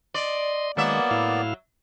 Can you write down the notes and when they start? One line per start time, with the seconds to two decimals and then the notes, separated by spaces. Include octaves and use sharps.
0.14 D5 D#5 C6
0.77 D#3 F#3 G#3 A#3 B3 D5 E5
1.11 A2 E4 F5